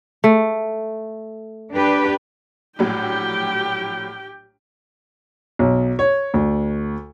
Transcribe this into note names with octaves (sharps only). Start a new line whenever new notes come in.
A3
D4 G4 B4
A#1 A2 F#3 G4 G5
B1
C#5
D2